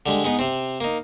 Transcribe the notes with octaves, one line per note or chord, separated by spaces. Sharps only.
D3 G3 G#3
G#3 B3 D#4
C3 C4
A#3 D#4